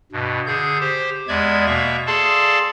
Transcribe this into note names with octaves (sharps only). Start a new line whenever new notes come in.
G2 B2
D3 G#4 G6
G4 C5
E2 G#3 D5 E5 G#6
B2 A#3 E5 C#6
G#4 A4 D5 F5 A5 C6